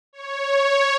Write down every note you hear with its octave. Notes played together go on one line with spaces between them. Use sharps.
C#5